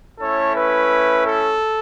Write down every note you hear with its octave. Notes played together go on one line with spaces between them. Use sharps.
A3 C#4 E4 A4 C#5
B4
A4